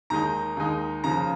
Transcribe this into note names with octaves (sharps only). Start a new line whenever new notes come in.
D#2 D#3 G#3 D#4 A#5
D#2 D#3 G#3 D#4
D#2 C#3 F3 A#5